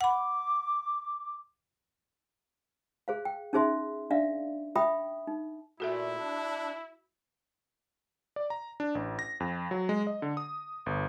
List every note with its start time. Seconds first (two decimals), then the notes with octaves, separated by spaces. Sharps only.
0.01 F#5 B5 D6
3.08 G#4 C5 F5
3.25 G5
3.53 C#4 D#4 G#4 C5 E5 C6
4.10 D4 D5 E5 F5
4.76 E5 G5 B5 D#6
5.27 D#4
5.80 A#2 A3 E4 F#4 A4 E5
6.17 D4
8.36 D5
8.50 A#5
8.80 D4
8.95 A1
9.19 A#6
9.40 F2
9.71 F#3
9.89 G#3
10.07 D#5
10.22 D3
10.37 D#6
10.86 G1